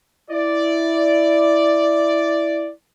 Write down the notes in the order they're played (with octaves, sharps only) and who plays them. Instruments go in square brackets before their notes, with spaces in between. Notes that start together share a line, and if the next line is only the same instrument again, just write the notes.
[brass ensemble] E4 D5